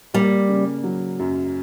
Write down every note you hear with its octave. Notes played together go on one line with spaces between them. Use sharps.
G3 A#3
C#3
F#3
F#2